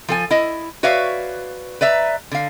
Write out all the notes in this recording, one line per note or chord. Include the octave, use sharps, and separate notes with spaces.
F3 A4 G#5
E4 D#5
F#4 B4 C#5 D5 E5 F5
B4 D5 E5 A#5
D3 F5